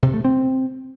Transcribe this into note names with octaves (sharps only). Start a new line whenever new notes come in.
C3
A3
C4